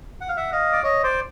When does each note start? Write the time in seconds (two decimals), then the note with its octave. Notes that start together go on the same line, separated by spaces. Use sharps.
0.21 F#5
0.29 F5
0.37 E5 F#5
0.52 D#5 F5
0.72 D5
0.83 C#5 D#5
1.03 C5 D5